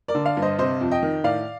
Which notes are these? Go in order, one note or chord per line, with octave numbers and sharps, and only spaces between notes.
A#4 D5
D3
D5 F5
G2
C5 D#5
C3 C5 D#5
F2
D#5 G5
D#3
A2 D5 F5